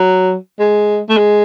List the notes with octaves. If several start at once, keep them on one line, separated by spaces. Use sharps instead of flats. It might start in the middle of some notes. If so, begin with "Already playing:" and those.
Already playing: F#3
G#3
A3
G#3